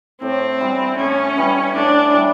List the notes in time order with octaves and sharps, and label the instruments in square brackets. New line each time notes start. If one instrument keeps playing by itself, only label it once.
[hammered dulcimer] A2 [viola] C4
[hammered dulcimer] E3 G3 B3
[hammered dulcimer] A2 [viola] C#4
[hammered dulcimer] E3 G3 B3
[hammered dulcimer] A2 [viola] D4
[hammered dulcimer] E3 G3 B3